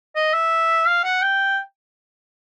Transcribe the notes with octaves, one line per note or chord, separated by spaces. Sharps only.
D#5
E5
F5
F#5
G5